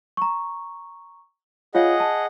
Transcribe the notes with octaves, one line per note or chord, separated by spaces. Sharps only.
A#5 C#6
F4 G#4 C#5 D#5 F5 F#5
A5